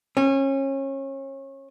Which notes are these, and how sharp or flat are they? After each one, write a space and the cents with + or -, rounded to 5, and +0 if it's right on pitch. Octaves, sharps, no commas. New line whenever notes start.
C#4 -30